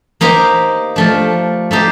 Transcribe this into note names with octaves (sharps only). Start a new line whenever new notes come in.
A#3 D#4 G4 C5
F3 A3 D4
A3 D#4 G4 C5